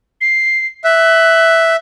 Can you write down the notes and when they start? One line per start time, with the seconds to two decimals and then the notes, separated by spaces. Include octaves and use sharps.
0.21 C7
0.84 E5 F#6